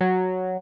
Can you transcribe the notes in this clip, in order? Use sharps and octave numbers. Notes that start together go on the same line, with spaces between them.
F#3